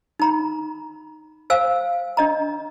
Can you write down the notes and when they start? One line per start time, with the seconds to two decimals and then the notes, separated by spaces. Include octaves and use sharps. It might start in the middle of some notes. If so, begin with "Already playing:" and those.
0.19 D#4 A#5 B5
1.50 C5 F5 G#5 E6
2.17 D4 D#5 A#5